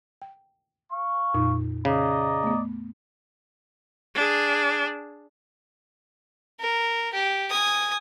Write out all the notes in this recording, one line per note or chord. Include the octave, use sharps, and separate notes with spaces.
G5
F5 C#6
F2 A#2 D#4
C#3 D5 D#5 A#5
A3 B3
D4 G#4
A#4
G4
G#5 D#6